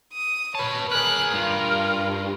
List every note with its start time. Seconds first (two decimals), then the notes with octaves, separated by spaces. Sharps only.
0.13 D#6
0.55 B4 C#5 A5
0.92 G#4 A#4 B4 F#6
1.33 G2 F4